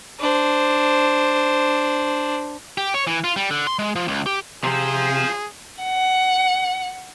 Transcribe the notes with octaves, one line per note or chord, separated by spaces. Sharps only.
D4 C5
G4
C#5
E3
F4
G3
D3
C6
G#3
F3
C#2
G4
C3 F4 G#4 C5
F#5